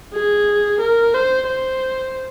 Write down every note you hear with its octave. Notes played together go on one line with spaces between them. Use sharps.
G#4
A#4
C5
C5